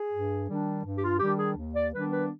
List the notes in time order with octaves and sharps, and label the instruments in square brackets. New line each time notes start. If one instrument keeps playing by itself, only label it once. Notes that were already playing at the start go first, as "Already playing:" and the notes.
Already playing: [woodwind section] G#4
G2
D#3 G3 D4
G2
G4
F4
D#3 G3 D4 G4
G#4
D#2
D5
D#3 G3 B3 D4 B4
B4